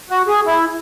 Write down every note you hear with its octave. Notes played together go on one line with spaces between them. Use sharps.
F#4
G#4
E4